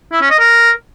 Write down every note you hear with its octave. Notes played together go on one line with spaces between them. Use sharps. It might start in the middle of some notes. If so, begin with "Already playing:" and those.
E4
C#4
D#5
A#4